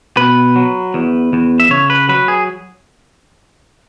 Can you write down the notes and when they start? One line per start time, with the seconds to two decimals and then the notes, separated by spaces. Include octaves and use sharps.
0.17 B2 B4
0.56 F#3
0.94 E2
1.33 E2
1.60 E5
1.70 C#3 C#5
1.90 B4
2.09 F#3 B4
2.28 G#4